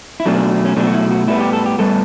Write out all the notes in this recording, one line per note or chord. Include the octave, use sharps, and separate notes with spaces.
E4
B2 F#3 A3 D4
C#4
B2 F#3 A3 D4
F#4
E4
F#4
A2 G3 B3 E4
G4
A4
G4
A2 G3 B3 A4